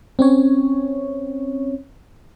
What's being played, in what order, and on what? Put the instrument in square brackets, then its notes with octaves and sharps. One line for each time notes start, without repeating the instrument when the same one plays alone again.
[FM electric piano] C4 C#4 C#5